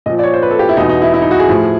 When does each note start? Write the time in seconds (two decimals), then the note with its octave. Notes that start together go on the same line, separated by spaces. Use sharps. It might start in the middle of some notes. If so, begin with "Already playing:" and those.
0.06 A#2 F3 D#5
0.19 D5
0.23 C#5
0.34 C5
0.42 B4
0.51 A4
0.59 G4
0.69 E4
0.77 E2 B2 D#4
0.89 D#4
1.02 E4
1.14 E4
1.22 D#4
1.31 F#4
1.40 G#4
1.49 A2 F3